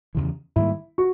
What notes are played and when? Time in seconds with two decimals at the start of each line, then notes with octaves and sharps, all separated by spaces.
0.15 E2 C#3 E3
0.56 G#2 D#3 G3 A#3 E4
0.98 F#4